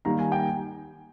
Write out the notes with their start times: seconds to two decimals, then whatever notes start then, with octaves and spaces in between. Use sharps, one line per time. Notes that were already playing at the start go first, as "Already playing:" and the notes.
0.05 D#3 G3 A#3 A#5
0.19 G#5
0.32 G5